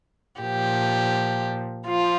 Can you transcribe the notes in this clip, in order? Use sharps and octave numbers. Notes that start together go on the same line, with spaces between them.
A#2 F3 G4
F3 F4